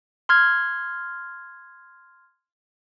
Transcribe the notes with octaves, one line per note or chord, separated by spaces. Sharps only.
C6 F6 G#6